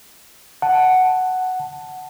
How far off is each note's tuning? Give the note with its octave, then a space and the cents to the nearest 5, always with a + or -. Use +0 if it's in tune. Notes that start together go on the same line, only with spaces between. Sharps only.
F#5 +0 A5 +0